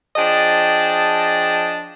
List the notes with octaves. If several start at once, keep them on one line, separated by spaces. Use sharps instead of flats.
F3 D4 G#4 D#5 G5 A5